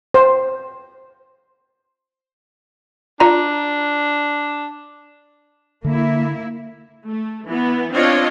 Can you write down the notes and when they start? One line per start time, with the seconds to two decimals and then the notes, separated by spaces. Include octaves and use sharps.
0.14 C5
3.20 D4 F4 D5 A#5
5.84 D3 A#3 E4
7.05 A3
7.46 E3 B3
7.91 C4 D4 F4 C#5 D#5 F5